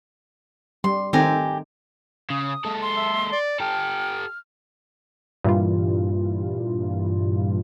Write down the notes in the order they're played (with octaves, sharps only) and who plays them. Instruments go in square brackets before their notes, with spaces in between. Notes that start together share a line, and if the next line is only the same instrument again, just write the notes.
[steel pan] G3 [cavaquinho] C6
[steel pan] D#3 A3 C4 [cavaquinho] G4 G#5 A#5
[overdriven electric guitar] C#3 [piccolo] D#6
[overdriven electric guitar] G#3 A4
[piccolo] C6
[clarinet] E5
D5
[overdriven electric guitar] G4 A4 [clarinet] G5 [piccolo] F6
[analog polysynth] G2 A#2 E3 G3 F4